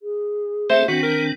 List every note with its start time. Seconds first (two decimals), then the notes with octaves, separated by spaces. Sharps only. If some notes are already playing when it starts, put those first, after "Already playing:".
0.01 G#4
0.70 A3 C4 A4 C5 E5
0.88 D#3 C4 D4 F#4 B6
1.03 A#4